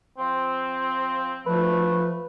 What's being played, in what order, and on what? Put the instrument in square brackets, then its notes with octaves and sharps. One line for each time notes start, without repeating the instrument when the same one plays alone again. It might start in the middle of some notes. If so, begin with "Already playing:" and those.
[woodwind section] F3 C4
[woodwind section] D2 A3 [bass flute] F3 [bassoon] B4